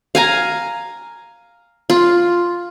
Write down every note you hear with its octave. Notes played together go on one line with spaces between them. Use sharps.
F5 G#5 A#5
F4